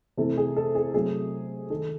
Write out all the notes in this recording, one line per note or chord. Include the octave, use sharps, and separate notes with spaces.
C3 E3 A3 A4
G#4
A4
G#4
C3 F#3 A3 G#4
D#3 G#3 A4